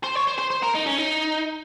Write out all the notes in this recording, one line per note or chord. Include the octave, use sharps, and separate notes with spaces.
C5
C#5
C5
C5
C5
A#4
D#4
C#4
D#4